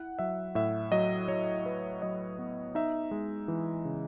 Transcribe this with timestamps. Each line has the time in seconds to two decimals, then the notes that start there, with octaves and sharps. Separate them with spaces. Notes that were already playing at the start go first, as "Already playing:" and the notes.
Already playing: E4 F#5
0.19 F#3 E5
0.55 A2 E5
0.92 F#3 D#5
1.28 F#3 C#5
1.66 E4 B4
2.02 F#3 D#5
2.39 B3
2.75 D#4 E5
3.11 G#3
3.48 E3
3.85 C#3